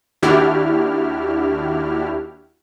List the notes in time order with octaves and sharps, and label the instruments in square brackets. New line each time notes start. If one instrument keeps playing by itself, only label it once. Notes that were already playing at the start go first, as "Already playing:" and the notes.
[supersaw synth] D#2 D4 E4 F#4 G4 F6